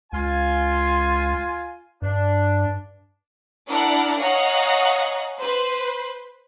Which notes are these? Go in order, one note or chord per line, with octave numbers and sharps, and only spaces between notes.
C#2 F4 G#5
G2 D4
D4 E4 A#4 D5 F#5
C#5 D#5 F5 F#5 G#5 A#5
B4 C5